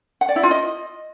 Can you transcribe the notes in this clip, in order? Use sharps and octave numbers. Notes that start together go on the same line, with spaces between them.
F#5
D5
E4
F4
D#5